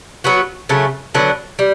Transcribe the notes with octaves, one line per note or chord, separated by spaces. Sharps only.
F#3 B3 F#4
C#3 F#3 A3
D3 F#3 B3 D4
G3